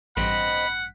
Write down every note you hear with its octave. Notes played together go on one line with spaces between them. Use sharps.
A1 G2 C4 D#5 F#5 B5 B6